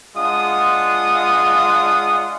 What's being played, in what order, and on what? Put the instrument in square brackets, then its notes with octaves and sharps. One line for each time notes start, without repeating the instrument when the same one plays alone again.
[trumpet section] G#3 D4 F4 F#5 D#6